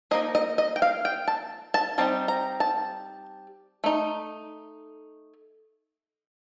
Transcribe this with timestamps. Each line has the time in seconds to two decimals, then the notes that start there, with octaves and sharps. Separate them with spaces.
0.11 F3 A#3 D#4 D#5
0.35 D#5
0.58 D#5
0.76 G5
0.82 F5
1.05 G5
1.28 A5
1.74 A5
1.98 G3 C4 D#4 A5
2.28 A#5
2.60 A5
3.84 A3 D#4